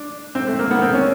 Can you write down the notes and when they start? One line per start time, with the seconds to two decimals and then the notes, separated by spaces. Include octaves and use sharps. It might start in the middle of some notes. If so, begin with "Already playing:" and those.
Already playing: D4
0.35 C4
0.47 A3
0.59 A#3
0.71 B3
0.82 C4
0.94 C#4